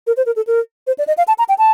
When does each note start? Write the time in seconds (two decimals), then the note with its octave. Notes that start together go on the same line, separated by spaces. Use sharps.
0.07 A#4
0.17 C5
0.26 A#4
0.36 A4
0.47 A#4
0.87 C5
0.98 D5
1.07 D#5
1.17 F5
1.28 A5
1.38 A#5
1.49 G5
1.58 A5